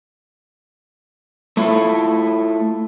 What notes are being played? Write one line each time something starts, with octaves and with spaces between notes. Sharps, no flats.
A3 E4 F4 A4